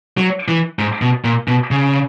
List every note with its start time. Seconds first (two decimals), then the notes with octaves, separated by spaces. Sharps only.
0.17 F#3
0.48 E3
0.79 G#2
1.02 B2
1.24 A#2
1.48 B2
1.71 C#3